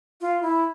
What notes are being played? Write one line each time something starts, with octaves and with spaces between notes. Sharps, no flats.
F4
E4